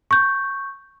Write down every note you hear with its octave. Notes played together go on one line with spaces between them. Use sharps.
C#6 G6